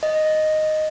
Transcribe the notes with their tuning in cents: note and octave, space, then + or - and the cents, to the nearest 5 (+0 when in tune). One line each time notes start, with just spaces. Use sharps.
D#5 -5